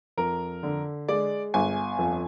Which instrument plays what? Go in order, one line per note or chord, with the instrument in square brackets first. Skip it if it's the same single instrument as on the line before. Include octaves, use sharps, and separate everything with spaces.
[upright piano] F2 [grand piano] A#4
[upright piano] D3
[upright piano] G#3 [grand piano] D5
[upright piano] G1 [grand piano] G#5
[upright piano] F2